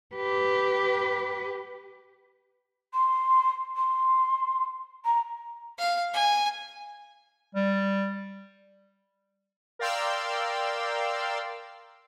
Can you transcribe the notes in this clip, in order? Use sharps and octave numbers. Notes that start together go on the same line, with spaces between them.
G4 B4
C6
C6
A#5
F5
G#5
G3
A#4 D5 F5 G5 C6 E6